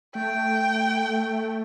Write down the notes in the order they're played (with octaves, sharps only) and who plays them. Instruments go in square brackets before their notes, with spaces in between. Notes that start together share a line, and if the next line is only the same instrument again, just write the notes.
[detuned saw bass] A3 [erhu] G5